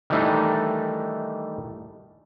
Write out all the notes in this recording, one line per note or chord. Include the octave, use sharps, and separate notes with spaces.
D#3 E3 G3 A3 D4 D#4